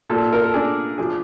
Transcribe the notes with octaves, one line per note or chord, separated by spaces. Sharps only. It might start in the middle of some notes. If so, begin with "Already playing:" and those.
A#2 A4
A#4
A4
D4 G#4
F3 G#4